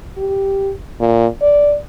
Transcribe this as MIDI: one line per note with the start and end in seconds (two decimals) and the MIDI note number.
0.18 0.72 67
1.00 1.27 46
1.42 1.77 74